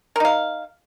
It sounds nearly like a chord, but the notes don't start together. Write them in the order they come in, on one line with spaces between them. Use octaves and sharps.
A#4 D#4 F5